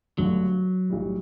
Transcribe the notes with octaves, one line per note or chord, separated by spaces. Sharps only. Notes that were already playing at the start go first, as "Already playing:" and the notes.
G1 G2 D3 F#3 A3 D4
B1 A2 G3